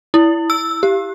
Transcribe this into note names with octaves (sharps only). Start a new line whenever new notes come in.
E4
E6
G4